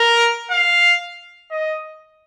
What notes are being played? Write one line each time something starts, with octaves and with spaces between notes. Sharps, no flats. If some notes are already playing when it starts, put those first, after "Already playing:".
Already playing: A#4
F5
D#5